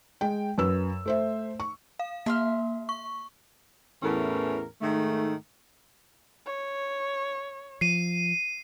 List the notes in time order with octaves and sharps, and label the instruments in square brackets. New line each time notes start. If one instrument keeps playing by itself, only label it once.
[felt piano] G#3 G5
F#2 B4 E6
A3 C5 E5
C#6
[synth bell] F5
[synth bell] A#3 [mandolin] E5 C6 F6
[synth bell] C#6
[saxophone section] E2 A2 E3 C#4 A#4
G#2 D#3 A3
[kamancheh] C#5
[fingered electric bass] F3 [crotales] C7 D#7